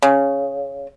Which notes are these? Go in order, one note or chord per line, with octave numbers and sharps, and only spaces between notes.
C#3